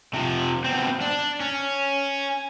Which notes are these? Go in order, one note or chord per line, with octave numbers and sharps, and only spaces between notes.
C3 F3
B2 C4
D4
C#4